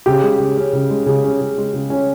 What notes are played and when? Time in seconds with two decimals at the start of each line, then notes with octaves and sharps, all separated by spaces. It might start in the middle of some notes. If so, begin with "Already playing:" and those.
0.06 C#3 G4
0.23 G#3
0.39 C#3
0.57 C#4
0.73 C#3
0.90 G#3
1.06 C#3
1.24 C#4
1.40 C#3
1.58 G#3
1.74 C#3
1.90 C#4